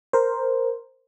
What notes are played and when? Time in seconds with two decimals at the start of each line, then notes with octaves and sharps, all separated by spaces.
0.13 A#4 C5